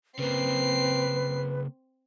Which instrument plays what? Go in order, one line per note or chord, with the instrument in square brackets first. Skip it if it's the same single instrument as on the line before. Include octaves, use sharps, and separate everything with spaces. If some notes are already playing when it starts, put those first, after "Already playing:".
[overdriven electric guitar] C#3 A#3 [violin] C4 C7 [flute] B4